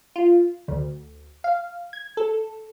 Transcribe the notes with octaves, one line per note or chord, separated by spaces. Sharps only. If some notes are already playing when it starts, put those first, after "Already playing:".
F4
D2
F5
G#6
A4